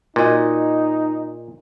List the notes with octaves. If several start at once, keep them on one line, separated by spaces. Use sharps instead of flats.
A#2 D#4 F#4 D#5